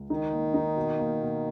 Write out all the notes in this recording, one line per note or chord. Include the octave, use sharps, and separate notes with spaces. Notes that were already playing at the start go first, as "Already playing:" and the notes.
Already playing: C#2
D#3 D#4
A#3
D#4
B2
A#3
B2